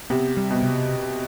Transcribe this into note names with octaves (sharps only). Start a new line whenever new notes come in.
C3 B3
G3
B2
C3